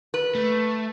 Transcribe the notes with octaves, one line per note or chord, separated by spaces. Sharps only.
B4
A3